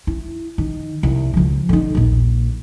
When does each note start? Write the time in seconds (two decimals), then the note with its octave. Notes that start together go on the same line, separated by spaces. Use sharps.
0.07 E4
0.58 D#3
1.03 C2
1.34 C#2 F3
1.69 D3 D#4
1.95 A#1 D#2